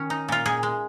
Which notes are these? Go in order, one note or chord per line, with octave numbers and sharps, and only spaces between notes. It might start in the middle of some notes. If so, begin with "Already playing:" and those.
Already playing: D#3 C#4
D#4
A#2 F4
A#2 G#4
G#3